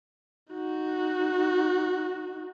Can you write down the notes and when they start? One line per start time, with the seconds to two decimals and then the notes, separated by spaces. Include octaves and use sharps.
0.54 D#4 F#4